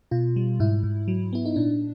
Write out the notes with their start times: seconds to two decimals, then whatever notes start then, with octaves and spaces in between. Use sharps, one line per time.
0.11 B2 F4
0.36 G3
0.60 G#2 E4
0.83 G#2
1.08 F#3
1.33 B3 E4
1.45 D#4
1.56 A#2 D4